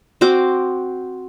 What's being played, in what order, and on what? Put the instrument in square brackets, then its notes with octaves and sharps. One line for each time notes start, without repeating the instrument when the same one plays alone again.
[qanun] C4 F#4 D6